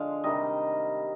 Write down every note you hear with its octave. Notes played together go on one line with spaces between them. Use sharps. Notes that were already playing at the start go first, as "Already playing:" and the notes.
Already playing: D3 F3 G#3 F5
C3 D#3 G3 D#5